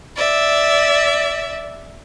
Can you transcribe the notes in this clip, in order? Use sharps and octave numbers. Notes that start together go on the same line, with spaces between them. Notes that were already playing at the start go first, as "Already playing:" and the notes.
D5 E5